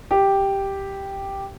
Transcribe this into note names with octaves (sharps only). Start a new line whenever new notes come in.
G4